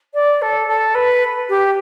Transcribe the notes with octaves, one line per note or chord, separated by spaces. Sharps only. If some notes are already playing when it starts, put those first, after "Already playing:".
D5
A4
A4
B4
G4